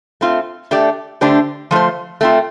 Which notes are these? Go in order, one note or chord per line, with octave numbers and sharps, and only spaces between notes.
A3 C4 F4
A3 D4 G4 D5
D3 A3 D4 G4 C5
F3 A3 F4 C5
A3 C4 F4